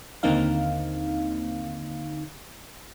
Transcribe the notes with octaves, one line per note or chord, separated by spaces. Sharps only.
D#2 D3 A#3 C4 D#4 F5